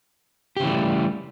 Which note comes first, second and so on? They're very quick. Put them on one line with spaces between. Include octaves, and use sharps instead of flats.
G4 C#3 E3 A3 G3